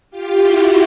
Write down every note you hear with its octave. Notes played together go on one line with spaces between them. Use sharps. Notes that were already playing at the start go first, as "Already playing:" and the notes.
F4 G4
E4 F#4